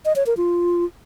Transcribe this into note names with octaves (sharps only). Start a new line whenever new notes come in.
D#5
C#5
A#4
F4